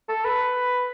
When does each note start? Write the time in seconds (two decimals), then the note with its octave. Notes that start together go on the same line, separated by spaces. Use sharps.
0.09 A4
0.25 B4